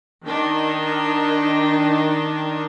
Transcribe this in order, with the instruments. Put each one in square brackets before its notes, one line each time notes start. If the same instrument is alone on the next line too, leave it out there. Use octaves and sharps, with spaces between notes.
[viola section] D#3 D4 D#4